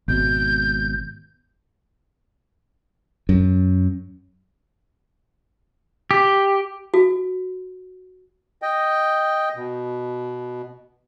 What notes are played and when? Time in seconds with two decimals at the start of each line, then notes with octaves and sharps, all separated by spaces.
0.08 G#1 B2 G6
3.29 F#2
6.11 G4
6.94 F#4
8.62 D#5 G5
9.56 B2